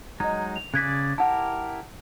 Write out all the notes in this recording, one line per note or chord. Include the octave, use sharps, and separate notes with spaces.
F#3 G#3 D#4 D#5 A#5
F7
C#3 G#4 D5 F#6 G#6 B6
E4 G4 A#4 F#5 A5